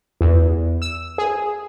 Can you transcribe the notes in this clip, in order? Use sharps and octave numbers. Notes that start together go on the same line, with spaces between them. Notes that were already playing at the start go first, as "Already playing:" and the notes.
E2
E6
G#4